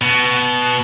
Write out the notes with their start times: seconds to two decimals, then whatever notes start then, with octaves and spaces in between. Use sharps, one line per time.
0.02 B2